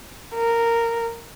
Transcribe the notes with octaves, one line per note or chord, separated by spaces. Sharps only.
A#4